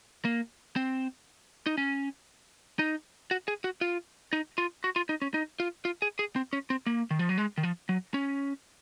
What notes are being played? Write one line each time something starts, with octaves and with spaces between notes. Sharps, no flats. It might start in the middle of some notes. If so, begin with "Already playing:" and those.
A#3
C4
D#4
C#4
D#4
F#4
G#4
F#4
F4
D#4
F4
F#4
F4
D#4
C#4
D#4
F4
F4
G#4
G#4
C4
C#4
C4
A#3
D#3
F3
F#3
G#3
D#3
F3
F#3
C#4